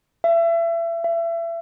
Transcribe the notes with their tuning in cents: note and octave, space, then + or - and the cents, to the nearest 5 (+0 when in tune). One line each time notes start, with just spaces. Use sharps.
E5 +30
E5 +30